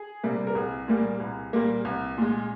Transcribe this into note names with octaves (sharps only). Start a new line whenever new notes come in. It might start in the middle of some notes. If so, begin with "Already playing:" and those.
Already playing: G#4
C3 G3 A#3
A#4
C2 G#4
A#2 G3 A#3
C2
A#2 G3 A#3
C2
A#2 G#3